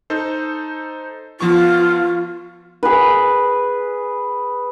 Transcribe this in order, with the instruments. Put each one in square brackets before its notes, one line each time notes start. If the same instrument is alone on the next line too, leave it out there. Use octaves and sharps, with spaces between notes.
[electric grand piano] D#4 A4 C5
[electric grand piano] F3 B3 C#6 [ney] F4
[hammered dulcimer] G#4 B4